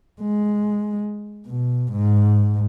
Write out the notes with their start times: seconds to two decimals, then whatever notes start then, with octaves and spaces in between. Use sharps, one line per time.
0.22 G#3
1.47 B2
1.92 G#2